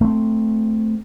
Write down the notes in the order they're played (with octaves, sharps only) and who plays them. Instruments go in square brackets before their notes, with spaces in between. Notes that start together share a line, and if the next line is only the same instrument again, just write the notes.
[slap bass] A3 C4